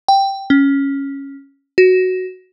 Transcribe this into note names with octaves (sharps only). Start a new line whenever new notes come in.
G5
C#4
F#4